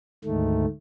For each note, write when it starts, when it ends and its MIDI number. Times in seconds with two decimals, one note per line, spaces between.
0.24 0.65 38
0.24 0.65 44
0.24 0.65 51
0.24 0.65 57